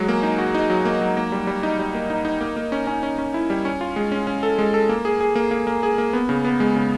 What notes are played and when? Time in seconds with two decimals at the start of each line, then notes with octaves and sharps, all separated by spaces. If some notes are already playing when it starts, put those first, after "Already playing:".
Already playing: F#3 G#3
0.08 A#3
0.23 D#4
0.38 F#4
0.55 D#4
0.70 F#3
0.85 A#3
1.01 F#3
1.17 A#3
1.32 G3
1.47 G3
1.63 D#4
1.79 G3
1.94 A#3
2.10 D#4
2.25 D#4
2.41 A#3
2.56 A#3
2.72 C#4
2.87 C#4
3.03 C#4
3.18 C#4
3.34 E4
3.50 G3
3.65 C#4
3.81 F4
3.96 G#3
4.12 C#4
4.27 C#4
4.43 A4
4.58 G#3
4.74 A4
4.89 A#3
5.05 G#4
5.20 G#4
5.35 A#3
5.51 A#3
5.67 A#3
5.83 G#4
5.98 A#3
6.13 B3
6.29 C#3
6.45 B3
6.60 G#3
6.76 C#3